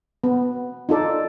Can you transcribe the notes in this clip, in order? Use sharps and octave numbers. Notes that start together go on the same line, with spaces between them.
B3
D#4 F4 A4 D5